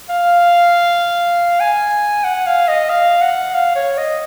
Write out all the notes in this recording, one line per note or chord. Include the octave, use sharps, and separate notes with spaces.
F5
G#5
F#5
F5
D#5
F5
F#5
F5
C#5
D#5